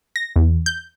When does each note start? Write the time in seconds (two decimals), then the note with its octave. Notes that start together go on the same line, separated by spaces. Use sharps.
0.16 A#6
0.36 E2
0.66 G6